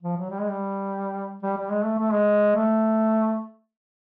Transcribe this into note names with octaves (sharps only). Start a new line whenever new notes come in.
F3
F#3
G3
G#3
G3
G3
G3
G#3
A3
A3
G#3
A3